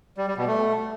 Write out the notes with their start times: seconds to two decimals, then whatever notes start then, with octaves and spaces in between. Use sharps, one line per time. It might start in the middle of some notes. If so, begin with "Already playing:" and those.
0.17 G3
0.27 G3
0.37 B2
0.47 A3